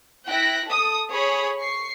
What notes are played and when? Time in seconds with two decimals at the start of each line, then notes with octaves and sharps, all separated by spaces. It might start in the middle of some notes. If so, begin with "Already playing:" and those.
0.27 E4 G5 F#6 A#6 B6
0.66 A4 D#6
1.11 G#4 C#5 B5 D#6
1.60 C#6 C7